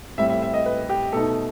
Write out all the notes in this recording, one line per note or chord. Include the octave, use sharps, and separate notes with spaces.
A2 G3 C4 E5
E5
E5
D#5
B4
G4
B2 A3 D#4 A4